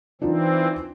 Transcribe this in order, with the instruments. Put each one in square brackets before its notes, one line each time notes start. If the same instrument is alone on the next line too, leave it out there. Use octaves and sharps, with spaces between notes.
[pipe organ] E3 C4 [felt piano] D4 D#4 F4